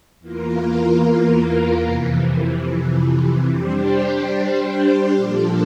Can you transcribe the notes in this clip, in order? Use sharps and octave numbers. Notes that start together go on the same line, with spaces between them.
E2 E3 A#3 F4 A#4
F2 C3 E3
G3 D4 G4 C5
A#2 F3 A#3 D4 A4